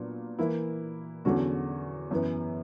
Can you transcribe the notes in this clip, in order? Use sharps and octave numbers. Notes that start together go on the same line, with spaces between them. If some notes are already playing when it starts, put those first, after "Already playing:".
Already playing: A#2 F#3 B3 D4
E3 A#3 E4
E2 D3 F#3 C#4 F#4
F#2 E3 B3